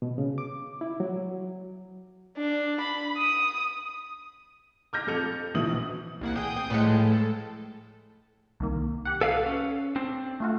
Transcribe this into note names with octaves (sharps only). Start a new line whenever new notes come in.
B2
C#3
D6
E4
F#3
D4
B5
D#6
D6 F6 G6 A#6
F2 A4 G6 F7
A#1 B2 E3 D#6 F#7
C2 A#3 F#5
E3 G#4 G5 D#6 G6
C4
A2 G#3 A3 B4 C#7
F3
A4
C2 D#3 A#3
G4 F#5
A4 B4 F5
C#4
C4 D4
A3 F4 F#4